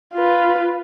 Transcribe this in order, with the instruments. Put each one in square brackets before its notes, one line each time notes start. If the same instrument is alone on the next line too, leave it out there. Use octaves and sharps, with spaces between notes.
[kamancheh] F4 B4